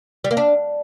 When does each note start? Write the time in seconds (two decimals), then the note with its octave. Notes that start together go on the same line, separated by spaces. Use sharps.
0.24 G3
0.31 A#3
0.37 D4